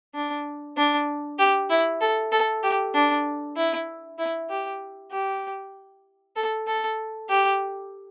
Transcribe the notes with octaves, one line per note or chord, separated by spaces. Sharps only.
D4
D4
G4
E4
A4
A4
G4
D4
E4
E4
G4
G4
A4
A4
G4